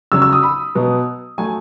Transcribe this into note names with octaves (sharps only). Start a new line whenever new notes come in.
C#3 F#3 C#4 E6
E6
D#6
B5
B2 F#3 B3
F#3 A3 G#5